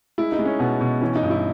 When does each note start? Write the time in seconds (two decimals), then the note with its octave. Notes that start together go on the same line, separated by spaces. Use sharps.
0.18 G#3 E4
0.32 D#4
0.39 G#3
0.45 C#4
0.59 B2 B3
0.81 B2
1.01 E3 C#4
1.16 D#4
1.23 G2
1.30 E4